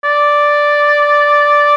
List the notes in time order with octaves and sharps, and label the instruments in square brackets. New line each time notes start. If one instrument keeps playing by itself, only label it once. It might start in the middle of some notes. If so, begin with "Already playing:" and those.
[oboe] D5